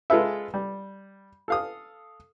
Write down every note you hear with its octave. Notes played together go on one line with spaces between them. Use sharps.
G#3 F4 G#4 A4 B4 E5
G3
A4 F5 D#6